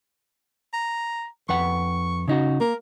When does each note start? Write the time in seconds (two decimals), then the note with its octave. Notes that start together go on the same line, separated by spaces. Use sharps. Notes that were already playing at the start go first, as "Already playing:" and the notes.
0.74 A#5
1.49 F2 B4 F#5 C#6
2.28 C#3 D#4 F#4
2.61 A#3 A#4